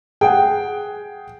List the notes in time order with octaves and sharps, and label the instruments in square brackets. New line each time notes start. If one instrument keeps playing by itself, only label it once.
[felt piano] G#4 F#5 [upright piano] G5